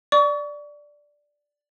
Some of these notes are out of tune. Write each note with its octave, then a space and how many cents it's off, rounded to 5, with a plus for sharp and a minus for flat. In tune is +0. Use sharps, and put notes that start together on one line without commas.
D5 +0 C#6 +35